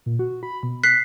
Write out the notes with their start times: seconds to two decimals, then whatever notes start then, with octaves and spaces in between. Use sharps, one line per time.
0.06 A#2
0.19 F#4
0.43 B5
0.63 B2
0.84 F#6 B6 C7